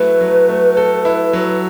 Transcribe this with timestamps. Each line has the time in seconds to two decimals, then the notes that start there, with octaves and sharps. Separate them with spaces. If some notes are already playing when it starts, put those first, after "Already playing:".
Already playing: F#3 A3 E4 A4 B4
0.21 F#3
0.49 A3
0.77 A4
1.05 E4
1.33 F#3